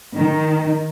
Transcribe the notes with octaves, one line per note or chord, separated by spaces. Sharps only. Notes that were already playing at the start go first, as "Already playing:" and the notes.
D#3